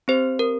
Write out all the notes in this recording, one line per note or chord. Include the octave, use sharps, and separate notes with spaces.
C4 G4 C5
A#4